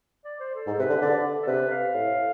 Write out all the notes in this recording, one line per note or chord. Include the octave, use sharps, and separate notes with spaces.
D5
C5
A4
G#2
C3 B4
D3
D3 D5
A4
C3 B4
F5
A2